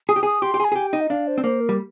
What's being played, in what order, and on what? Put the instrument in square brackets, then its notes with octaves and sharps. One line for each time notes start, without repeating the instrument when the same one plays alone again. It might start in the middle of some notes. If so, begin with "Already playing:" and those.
[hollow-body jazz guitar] G#4 [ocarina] D#6
[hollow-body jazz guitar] G4
[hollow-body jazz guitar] G#4 [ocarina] D#6
[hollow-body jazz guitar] G4 [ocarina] C6
[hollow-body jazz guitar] G4
G#4
[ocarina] G#5
[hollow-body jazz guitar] G#4
G4
[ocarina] G5
[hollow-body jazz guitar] D#4
[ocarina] D#5
[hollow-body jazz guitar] D4 [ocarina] F5
[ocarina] C5
[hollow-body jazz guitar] C4
[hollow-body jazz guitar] A#3 [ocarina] C5
[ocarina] A#4
[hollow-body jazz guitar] G3